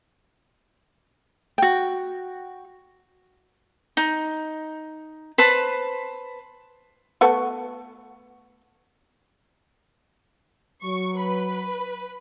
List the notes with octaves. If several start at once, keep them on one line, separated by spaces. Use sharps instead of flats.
F#4 G5
D#4
B4 C5 A5 B5
A3 B3 F#4
F#3 C#6
B4 B5